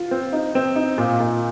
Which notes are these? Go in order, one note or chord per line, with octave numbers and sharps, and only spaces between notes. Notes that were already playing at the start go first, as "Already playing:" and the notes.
Already playing: F4
C4
D#4
C4
D#4
A#2
A#2